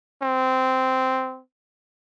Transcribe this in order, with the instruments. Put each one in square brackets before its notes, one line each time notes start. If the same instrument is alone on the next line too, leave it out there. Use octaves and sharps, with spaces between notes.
[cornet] C4